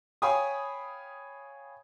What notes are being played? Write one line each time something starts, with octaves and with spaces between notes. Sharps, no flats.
C#5 F5 G5 G#5 B5 D#6